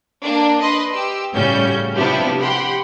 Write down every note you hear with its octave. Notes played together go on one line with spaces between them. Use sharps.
A#3 D4
B4 D#5 C6
G4 E6
A2 C#3 G3 C#4 F#4 G6
C3 F3 B3 D4 E4 G4
G4 F#5 G5 B5 C6